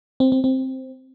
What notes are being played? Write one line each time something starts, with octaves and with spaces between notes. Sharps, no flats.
C4
C4
C4